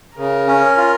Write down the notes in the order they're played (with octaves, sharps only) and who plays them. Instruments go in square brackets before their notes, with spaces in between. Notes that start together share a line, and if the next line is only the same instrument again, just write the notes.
[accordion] C#3 [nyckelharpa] A#4
[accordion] C#4
F4